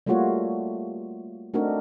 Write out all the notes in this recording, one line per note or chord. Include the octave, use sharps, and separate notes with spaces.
G3 A3 A#3 F4 F#4 C#5
A3 C4 D4 D#4 F#4 A#4